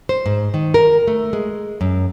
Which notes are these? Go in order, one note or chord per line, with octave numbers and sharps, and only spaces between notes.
C5
G#2
D#3
A#4
A3
G#3
F#2